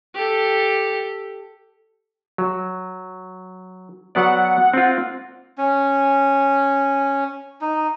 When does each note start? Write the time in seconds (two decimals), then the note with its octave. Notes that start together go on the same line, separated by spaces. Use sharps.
0.15 G4 A4
2.38 F#3
4.15 F#3 B3 D5 F#5
4.74 C4 F4
5.58 C#4
7.61 D#4